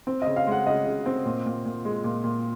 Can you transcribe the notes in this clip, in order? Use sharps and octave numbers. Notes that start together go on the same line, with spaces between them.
C4
C#3 D#5
F5
G#3 F#5
C#3 D#5
C#3
C4
A#2
A#2
A#2
G#3
A#2
A#2